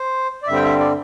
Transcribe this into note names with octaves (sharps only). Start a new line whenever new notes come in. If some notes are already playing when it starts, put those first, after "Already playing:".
Already playing: C5
D5
G2 D3 G3 C4 E5
G5
E5
D5